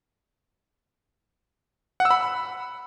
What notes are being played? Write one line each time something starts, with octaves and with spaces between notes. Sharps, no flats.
F#5
E6
B5